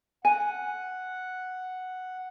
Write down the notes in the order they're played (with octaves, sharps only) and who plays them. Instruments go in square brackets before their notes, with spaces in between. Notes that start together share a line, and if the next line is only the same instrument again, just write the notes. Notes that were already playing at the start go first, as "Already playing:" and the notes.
[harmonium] F#5 [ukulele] G#5